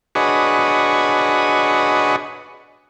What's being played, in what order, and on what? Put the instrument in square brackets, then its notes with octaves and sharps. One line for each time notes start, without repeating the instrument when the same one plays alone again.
[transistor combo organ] D4 F#4 G#4 B4 C#5 D#5